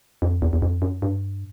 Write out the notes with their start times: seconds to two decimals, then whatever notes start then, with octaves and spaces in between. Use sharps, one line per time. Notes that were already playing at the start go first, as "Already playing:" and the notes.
0.22 F2
0.42 E2
0.53 E2
0.62 F2
0.82 F#2
1.02 G2